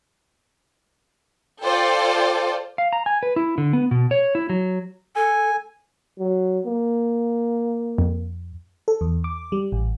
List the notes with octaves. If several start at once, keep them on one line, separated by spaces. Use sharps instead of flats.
F4 A4 C5 D5 G5
F5
A#5
G#5
B4
E4
D3
B3
B2
C#5
E4
F#3
A4 G#5
F#3
A#3
F2
A4
E2
D6
G3
A1